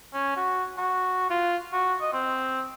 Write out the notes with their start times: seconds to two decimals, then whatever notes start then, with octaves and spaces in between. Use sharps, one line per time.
0.13 C#4
0.36 F#4
0.78 F#4
1.30 F4
1.73 F#4
2.01 D#5
2.13 C4